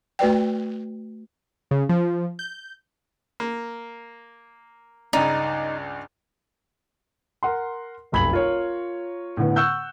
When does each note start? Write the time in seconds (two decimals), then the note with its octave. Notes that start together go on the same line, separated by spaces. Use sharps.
0.19 A3 F#4 B4 D5 G5
1.71 C#3
1.89 F3
2.39 G6
3.40 A#3
5.13 C#2 G2 D#4 D5
7.43 A#4 F#5 C6
8.12 F1 B1 B5 G#6 F#7
8.33 F4 A#4 C#5
9.37 A2 D3 B3
9.56 F#5 C#6 E6 F#6 G6